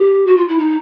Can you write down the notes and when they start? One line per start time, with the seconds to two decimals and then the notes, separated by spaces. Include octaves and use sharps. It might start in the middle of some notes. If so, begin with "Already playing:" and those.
Already playing: G4
0.27 F#4
0.37 F4
0.48 E4
0.59 D#4